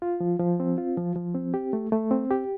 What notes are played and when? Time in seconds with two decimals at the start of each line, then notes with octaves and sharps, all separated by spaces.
0.02 F4
0.20 F3
0.40 F3
0.60 C4
0.78 F4
0.98 F3
1.16 F3
1.35 C4
1.54 G4
1.73 A3
1.92 A3
2.11 C4
2.31 G4